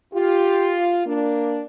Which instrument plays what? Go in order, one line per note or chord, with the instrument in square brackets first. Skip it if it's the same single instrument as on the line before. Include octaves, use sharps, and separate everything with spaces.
[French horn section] F4 [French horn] G4
[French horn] A#3 [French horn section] D4